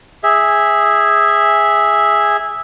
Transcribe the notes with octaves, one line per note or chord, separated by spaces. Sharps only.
G#4 E5